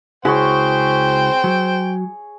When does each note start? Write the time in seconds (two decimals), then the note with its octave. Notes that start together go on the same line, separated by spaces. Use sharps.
0.25 C#2 E4 F#4 G#4 C5 C#5 G5
1.44 F#3